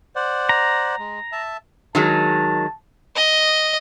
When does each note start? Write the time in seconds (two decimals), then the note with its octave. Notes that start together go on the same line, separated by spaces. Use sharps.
0.16 C5 D5 F#5
0.49 A#5
0.99 G#3
1.32 E5 A5
1.95 D#3 F#3 G#3 A5
3.16 D#5